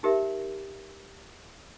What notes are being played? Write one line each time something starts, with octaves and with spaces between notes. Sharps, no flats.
D#4 G4 A#4 E5